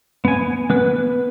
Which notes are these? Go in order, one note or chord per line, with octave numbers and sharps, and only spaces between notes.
B3 G#5
B3 B4